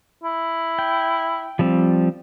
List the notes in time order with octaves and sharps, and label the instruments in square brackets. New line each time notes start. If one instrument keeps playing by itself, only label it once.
[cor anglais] E4
[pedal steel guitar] G5
F3 G3 C4